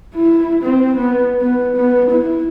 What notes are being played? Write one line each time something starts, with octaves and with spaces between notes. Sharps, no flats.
E4
C4
B3
B3
B3
E4